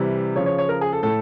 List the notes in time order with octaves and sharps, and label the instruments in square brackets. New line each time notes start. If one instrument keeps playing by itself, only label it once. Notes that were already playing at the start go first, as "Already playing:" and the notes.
Already playing: [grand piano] C3 E3 G3
C#3 F3 C#5
C#5
C#5
A#4
G#4
A4
A2 A4